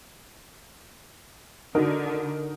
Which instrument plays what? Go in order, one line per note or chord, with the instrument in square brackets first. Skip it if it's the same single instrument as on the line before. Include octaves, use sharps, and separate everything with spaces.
[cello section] D3 [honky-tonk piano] D#4 F#4 A#4